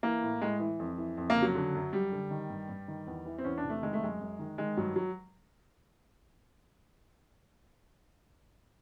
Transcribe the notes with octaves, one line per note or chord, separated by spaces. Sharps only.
E3 A#3
A2
A2 G#3
E3
F2
E3
F2
A#3
C#3
F#3
D3
F#2
F#2 G3
D3
D#3
G2
G2
D#3
E2
E3
C4
E2 C#4
D4
C3
A3
D#3 G#3
A3
F#2 G#3
F#2
D#3
D#3 G#3
G2 F#3
F#3